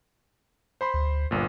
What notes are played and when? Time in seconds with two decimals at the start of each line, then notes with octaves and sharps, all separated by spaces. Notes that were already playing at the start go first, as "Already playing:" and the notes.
0.81 C5 B5 C6
0.94 D2
1.31 G1 A#2